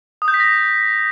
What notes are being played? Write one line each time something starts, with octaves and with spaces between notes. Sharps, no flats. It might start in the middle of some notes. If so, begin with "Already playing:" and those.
D#6
G6
B6
A#6